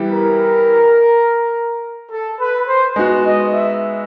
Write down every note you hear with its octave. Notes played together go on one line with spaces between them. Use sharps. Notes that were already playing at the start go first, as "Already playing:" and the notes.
Already playing: E3 G3 B3 E4 G4
A#4
A4
B4
C5
G#3 B3 D#4 F#4
D#5
E5